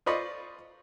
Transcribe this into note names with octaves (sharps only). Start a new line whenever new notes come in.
F4 C5 D5 D#5 B5 C#6